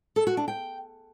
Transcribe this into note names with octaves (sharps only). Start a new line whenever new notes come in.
A4
F#4
D4
G5